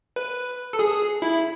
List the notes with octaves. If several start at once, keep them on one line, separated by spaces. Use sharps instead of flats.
B4
A4
G#4
E4